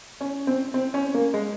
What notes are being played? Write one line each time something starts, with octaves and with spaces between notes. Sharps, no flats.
C#4
C4
C4
C#4
A#3
G#3